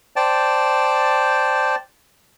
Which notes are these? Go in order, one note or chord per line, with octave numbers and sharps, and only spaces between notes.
C5 D5 G5 A5